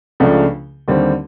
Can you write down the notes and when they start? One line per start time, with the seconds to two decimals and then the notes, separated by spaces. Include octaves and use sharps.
0.20 C#2 C#3 F3 A3 D4
0.88 D#2 D3 G3 C4